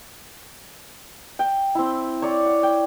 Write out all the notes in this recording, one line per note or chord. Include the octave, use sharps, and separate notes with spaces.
G5
C4 E4
C#5 D5 D6
F#5
G5